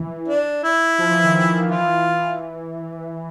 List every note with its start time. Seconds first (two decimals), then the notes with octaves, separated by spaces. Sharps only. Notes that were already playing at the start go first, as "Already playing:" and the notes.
Already playing: E3
0.28 D4
0.63 E4
0.98 F3
1.11 E3
1.24 D#3
1.35 E3
1.59 D#3
1.70 E3 F4